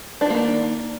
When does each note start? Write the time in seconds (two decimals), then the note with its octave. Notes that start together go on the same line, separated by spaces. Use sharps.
0.21 D4
0.26 F3
0.30 A#3
0.35 D#3